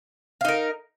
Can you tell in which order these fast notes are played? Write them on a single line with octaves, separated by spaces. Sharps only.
F5 D#4 A#4